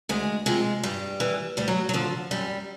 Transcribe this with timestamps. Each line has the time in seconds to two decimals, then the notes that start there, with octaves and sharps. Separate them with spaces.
0.09 D2 G#3
0.46 C3 F3 G#3
0.83 G2 G3
1.20 E3
1.57 D2 G3
1.68 F#3
1.89 F#3
1.94 D3 F3
2.31 F#2 G3